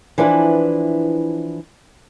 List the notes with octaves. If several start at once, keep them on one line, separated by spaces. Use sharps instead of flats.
E3 F3 D4 E4 B4